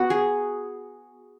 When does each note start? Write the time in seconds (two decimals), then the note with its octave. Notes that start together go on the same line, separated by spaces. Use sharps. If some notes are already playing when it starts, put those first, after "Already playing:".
Already playing: B3 F#4
0.10 G#4